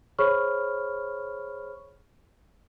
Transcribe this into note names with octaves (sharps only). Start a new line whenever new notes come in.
G#4 C5 C#5 B5 C#6 F6